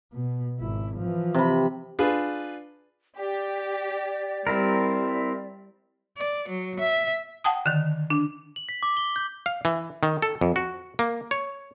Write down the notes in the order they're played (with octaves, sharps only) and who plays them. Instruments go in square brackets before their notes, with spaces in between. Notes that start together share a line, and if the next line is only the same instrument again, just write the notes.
[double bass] B2
G#1 E4
E3 F3
[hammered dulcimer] C3 B5
[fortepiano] D4 F4 G#4 B4
[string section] G4 [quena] D5
[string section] G3 [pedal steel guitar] C4 E4 A#4
[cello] D5
F#3
E5
[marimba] F#5 G5 A5 D#6
D3 D#3
D4
[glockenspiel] F#7
B6
D6
G7
G6
[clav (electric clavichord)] F5
E3
D#3
A4
F2
F#4
A#3
C#5